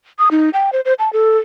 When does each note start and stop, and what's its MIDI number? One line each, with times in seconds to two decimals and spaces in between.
0.19 0.29 87
0.31 0.50 63
0.54 0.70 79
0.73 0.81 72
0.85 0.94 72
0.99 1.12 81
1.13 1.38 69